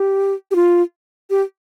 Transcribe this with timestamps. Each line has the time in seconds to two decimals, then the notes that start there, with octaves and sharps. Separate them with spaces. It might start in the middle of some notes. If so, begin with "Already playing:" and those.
Already playing: G4
0.51 G4
0.56 F4
1.30 G4